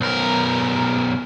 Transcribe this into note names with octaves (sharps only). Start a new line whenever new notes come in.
B1 A#4